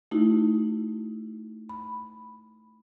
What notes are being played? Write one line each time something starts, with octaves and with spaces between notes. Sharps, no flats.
A3 D#4 E4 F#4
B5